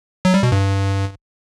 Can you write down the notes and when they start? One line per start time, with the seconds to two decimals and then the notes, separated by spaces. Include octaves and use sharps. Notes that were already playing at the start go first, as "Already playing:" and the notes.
0.25 F#3
0.34 G3
0.43 B2
0.52 G2